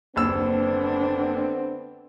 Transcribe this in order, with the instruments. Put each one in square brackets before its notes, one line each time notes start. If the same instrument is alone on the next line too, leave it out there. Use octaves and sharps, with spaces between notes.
[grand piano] F#1 D#2 E6 [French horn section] D3 B3 C4 [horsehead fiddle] D4